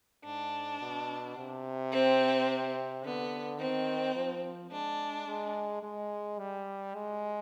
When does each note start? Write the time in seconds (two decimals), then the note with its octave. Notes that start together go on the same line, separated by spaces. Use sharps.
0.25 G#2 D4
0.81 B2
1.36 C3
1.92 C4
3.05 D3 B3
3.59 D#3 C4
4.16 F3
4.71 G#3 D4
5.28 G#3
5.83 G#3
6.39 G3
6.95 G#3